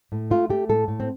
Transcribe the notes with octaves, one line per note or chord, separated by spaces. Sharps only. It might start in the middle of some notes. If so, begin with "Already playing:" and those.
A2
A3 F4
A3 G4
A2 A4
A2
C4